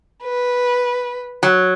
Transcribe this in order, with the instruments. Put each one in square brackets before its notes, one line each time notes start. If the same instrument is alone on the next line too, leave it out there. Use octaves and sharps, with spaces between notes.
[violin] B4
[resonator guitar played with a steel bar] F#3